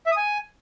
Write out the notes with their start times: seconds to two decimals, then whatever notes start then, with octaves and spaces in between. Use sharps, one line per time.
0.06 E5
0.12 D#6
0.17 G#5